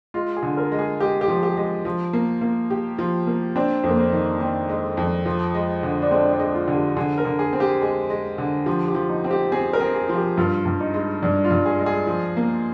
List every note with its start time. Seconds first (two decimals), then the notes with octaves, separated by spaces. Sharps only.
0.14 G#3 F4
0.37 G#4
0.43 D3
0.57 A#4
0.72 G#3
0.79 G#4
1.00 G#3 G4
1.21 G4
1.28 F3
1.43 G4
1.57 G#3
1.85 F3
2.13 A#3
2.41 A#3
2.70 G4
2.99 F3
3.27 A#3
3.56 C4 D4
3.84 F2
3.89 A#3
3.99 C4
4.12 D#3
4.40 D#3 C4
4.69 G#3
4.97 F2
5.25 F3
5.54 G#3
5.83 D3
6.02 D4
6.11 G#3 C4
6.33 D4
6.40 G#3
6.54 F4
6.68 D3
6.75 G4
6.96 D3 G#4
7.18 A#4
7.25 D3
7.39 G#4
7.53 C4
7.60 G4
7.82 G#3 G#4
8.10 G#3
8.38 D3
8.66 F3 G4
8.88 G4
8.95 F3
9.09 D#4
9.24 C4
9.31 G4
9.52 C4 G#4
9.73 A#4
9.80 C4
9.94 G#4
10.09 F3
10.15 G4
10.37 G2 F4
10.65 G2
10.80 D#4
10.94 G#3
11.22 G2 D4
11.44 F4
11.51 G2
11.66 G#4
11.79 G#3
11.86 G#4
12.07 F3
12.37 A#3